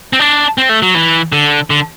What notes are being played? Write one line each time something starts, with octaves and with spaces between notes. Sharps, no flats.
C4
D4
C4
A3
F#3
E3
D3
D3